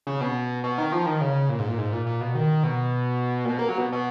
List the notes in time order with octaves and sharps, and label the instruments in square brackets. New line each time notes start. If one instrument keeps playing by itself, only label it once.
[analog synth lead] C#3
B2
B2
D#3
F3
D#3
C#3
A#2
G#2
A#2
G#2
A#2
A#2
B2
D#3
B2
A#2
B2
A#3
F#3
B2
B2